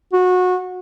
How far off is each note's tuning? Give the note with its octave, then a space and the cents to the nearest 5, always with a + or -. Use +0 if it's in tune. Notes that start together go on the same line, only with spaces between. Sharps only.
F#4 -20